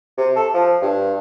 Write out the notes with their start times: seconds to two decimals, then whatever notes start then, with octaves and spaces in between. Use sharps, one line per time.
0.18 C3
0.36 A4
0.54 F3
0.82 G2